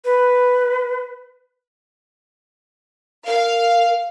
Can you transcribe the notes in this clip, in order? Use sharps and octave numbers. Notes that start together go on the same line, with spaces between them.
B4
A#4 F5